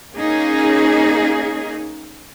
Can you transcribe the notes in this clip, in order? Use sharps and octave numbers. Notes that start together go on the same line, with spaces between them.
A#3 C#4 D#4 G#4